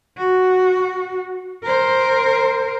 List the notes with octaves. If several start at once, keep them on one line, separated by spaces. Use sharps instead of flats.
F#4
A#4 C5